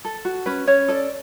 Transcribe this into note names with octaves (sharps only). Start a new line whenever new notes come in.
A4
F#4
C#4 B4
C#4 C#5
A4 D5